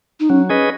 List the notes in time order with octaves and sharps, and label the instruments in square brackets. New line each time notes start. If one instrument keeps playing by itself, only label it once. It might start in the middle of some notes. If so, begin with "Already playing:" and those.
[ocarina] D#4
[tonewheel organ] F#3 [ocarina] C#4
[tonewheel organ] C#4 G#4 B4 D#5